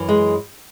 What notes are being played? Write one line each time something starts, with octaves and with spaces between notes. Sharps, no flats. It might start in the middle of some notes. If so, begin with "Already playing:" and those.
Already playing: F#2 E3
G#3